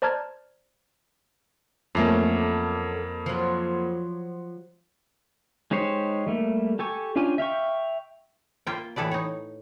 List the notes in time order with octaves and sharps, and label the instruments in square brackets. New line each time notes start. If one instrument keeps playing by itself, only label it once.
[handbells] C5 D5 A5 A#5 F6 G#6
[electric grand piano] F2 A#3 [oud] F#3 A3 C#4
[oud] F3 F#3
[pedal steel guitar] G#3 D#4 G4 C5 C#5
G3 A3 A#3
G4 A4 G#5 C#6
C#4 D4 F4 G4 G#5
E5 F5 G5 C#6
[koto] A#3 F4 E5 G5
A2 E3 E4 A4 B4 D5
D#4 C#5